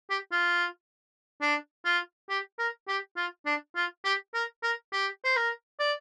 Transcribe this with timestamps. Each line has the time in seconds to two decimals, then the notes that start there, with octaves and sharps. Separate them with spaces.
0.10 G4
0.32 F4
1.42 D4
1.85 F4
2.29 G4
2.59 A#4
2.88 G4
3.17 F4
3.46 D4
3.76 F4
4.05 G4
4.34 A#4
4.63 A#4
4.93 G4
5.24 C5
5.36 A#4
5.79 D5